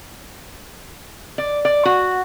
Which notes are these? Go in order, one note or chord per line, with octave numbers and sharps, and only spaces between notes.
D5
D5
F#4